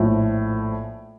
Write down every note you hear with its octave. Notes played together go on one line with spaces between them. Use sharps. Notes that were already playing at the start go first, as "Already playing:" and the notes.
Already playing: A#1 A2 F3